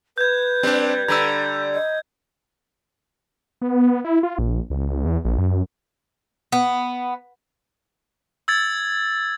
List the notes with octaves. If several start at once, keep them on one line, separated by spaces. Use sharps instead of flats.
B4 G6 G#6
G3 C4 D4
D3 G3 A#5 B5 E6 G#6
D#5
B3
B3
E4
F4
A#1
C#2
E2
A#1
F#2
B3
E6 G#6 A6